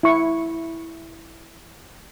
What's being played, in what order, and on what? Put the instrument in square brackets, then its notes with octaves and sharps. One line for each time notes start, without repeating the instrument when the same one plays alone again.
[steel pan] E4 C#6